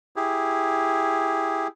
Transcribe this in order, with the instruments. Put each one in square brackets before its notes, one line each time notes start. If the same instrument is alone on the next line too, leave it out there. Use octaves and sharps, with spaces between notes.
[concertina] E4 G4 G#4